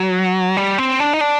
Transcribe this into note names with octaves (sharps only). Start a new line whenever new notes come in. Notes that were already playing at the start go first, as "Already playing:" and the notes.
Already playing: F#3
G3
C4
D4
D#4
D4